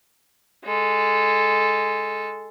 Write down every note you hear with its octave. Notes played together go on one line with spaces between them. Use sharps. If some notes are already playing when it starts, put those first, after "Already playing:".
G#3 A4